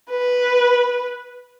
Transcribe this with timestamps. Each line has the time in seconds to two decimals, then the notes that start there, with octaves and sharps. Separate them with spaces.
0.10 B4